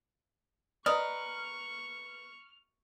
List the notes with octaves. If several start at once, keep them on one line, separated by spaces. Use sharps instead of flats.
A#4 B4 D5 D#5 C#6 D#6 F6